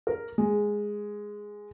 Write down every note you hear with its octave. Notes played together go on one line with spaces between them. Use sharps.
A#4
G#3